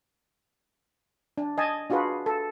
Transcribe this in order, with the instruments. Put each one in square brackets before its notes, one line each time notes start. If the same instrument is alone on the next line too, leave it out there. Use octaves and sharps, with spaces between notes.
[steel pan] D4
D#5 G#5 A5
D4 F4 F#4 G#4 B4
A4